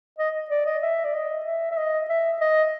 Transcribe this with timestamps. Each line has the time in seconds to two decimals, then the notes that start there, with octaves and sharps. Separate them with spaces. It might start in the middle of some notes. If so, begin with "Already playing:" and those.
0.18 D#5
0.50 D5
0.66 D#5
0.83 E5
1.04 D5
1.14 D#5
1.45 E5
1.71 E5
1.78 D#5
2.09 E5
2.41 D#5